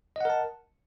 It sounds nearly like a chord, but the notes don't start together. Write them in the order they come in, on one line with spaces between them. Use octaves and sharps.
D#5 F#5 A#4 A5